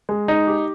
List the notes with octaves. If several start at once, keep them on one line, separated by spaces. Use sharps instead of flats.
G#3
D#4
G4